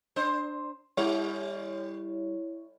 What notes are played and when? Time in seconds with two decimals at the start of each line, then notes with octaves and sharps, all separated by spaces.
0.16 D4 C5
0.97 G3 E4 C#5